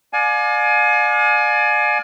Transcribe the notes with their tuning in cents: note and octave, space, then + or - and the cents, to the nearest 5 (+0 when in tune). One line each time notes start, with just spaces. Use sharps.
D5 +25 F5 +35 G#5 +25